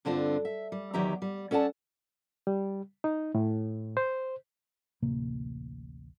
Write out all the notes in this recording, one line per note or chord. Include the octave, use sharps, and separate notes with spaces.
G2 D3 C4 D4 F4
E5
G3
E2 D#3 F#3 G4 E5 A#5
G3
C#4 A4 D5 F#5 A5
G3
D#4
A2
C5
D1 A1 C3 A#3